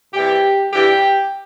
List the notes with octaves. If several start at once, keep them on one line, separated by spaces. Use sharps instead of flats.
C3 E3 G3 G4
G2 E3 G3 G4